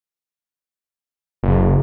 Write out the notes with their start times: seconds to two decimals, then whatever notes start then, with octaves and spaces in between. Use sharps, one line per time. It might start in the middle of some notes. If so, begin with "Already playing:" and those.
1.43 F#1